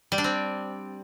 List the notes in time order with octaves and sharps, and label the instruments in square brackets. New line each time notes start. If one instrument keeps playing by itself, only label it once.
[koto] G3
D4
C4